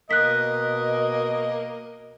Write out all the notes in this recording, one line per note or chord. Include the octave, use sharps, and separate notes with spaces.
B2 A#3 D#5 F#6 B6